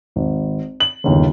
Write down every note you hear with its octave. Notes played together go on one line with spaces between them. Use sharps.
G#1
F#7
G1 D#2 C#3